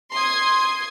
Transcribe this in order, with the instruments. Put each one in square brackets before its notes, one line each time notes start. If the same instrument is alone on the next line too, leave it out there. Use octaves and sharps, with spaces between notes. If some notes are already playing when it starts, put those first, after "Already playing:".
[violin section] C6 D#6 G#6